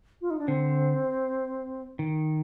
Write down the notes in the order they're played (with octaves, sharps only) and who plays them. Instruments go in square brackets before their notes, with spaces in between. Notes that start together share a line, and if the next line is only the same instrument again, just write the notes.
[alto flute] F4
D#4
D4
[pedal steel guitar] D3 [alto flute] C4
[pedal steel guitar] D#3